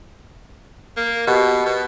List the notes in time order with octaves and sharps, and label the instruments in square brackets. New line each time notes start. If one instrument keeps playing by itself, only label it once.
[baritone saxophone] A#3
[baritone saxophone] B2 [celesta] G4 D#5 F#5
[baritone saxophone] B2